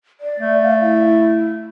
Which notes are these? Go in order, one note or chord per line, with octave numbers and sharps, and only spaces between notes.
D5
A3
F5
E4